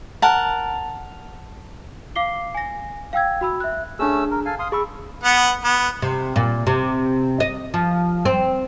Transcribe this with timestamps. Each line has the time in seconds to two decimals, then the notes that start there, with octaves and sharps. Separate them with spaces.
0.22 A#4 F#5 A5
2.16 F5 D6 C7 G7
2.55 G#5 A#6
3.13 F5 G5 E6 G#6
3.41 F#4 B5 E6
3.60 E5 F#6
3.99 A3 C#4 D4 G#4 E6
4.31 A#4
4.45 A4 F5 G#5
4.59 F5 C6 D#6
4.72 G#4 B5 C#6 E6
5.23 B3 F#5
5.64 B3
6.02 C3
6.36 A#2
6.67 C3
7.40 D#5
7.74 F3
8.25 C4